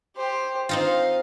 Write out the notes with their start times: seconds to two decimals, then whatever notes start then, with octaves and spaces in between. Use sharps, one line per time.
0.16 G4 C5
0.69 C4 D#4 F4 D#5 F5